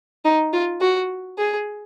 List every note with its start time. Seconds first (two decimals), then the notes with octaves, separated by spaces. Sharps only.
0.25 D#4
0.53 F4
0.81 F#4
1.38 G#4